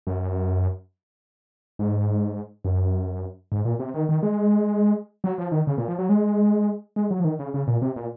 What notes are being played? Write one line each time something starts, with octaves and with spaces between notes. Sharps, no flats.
F#2
G#2
F#2
G#2
A#2
C3
D#3
D#3
G#3
F#3
F3
D#3
C#3
A#2
F3
F#3
G#3
G#3
F#3
F3
D#3
C#3
C#3
A#2
C3
A#2